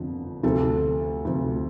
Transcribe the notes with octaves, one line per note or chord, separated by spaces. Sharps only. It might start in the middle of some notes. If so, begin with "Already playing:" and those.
Already playing: G1 F2 D3 F3
D2 C3 F3 A4
D2 C3 F3